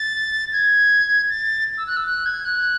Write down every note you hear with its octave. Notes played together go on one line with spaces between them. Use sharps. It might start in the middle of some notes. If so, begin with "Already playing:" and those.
Already playing: A6
G#6
A6
E6
F#6
E6
F#6
G#6
F#6